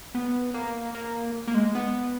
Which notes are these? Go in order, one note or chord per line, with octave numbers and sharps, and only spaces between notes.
B3
A#3
A#3
A#3
G#3
B3